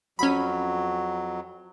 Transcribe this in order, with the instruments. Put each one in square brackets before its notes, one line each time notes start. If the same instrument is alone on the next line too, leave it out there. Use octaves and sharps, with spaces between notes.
[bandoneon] F2 F#3 [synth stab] C#4 B5